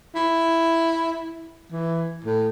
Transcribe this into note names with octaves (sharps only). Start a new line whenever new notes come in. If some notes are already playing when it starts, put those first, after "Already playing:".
E4
E3
A2